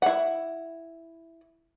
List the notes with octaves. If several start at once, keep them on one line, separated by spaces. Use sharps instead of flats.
E4 F#5